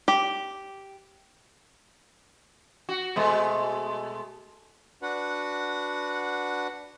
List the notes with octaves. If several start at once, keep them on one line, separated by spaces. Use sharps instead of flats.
G4
F#4
B2 G#3 A3
D4 F#4 B4 F#5